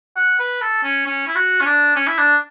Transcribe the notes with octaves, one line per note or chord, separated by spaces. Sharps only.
F#5
B4
A4
C#4
C#4
E4
F#4
C#4
D4
C#4
E4
D4